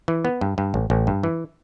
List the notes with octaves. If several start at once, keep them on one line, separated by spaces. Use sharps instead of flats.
E3
B3
G2
G2
A1
A1
G2
E3